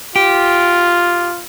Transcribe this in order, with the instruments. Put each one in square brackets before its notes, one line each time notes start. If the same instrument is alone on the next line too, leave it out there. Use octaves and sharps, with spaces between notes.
[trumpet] F4 [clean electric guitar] G4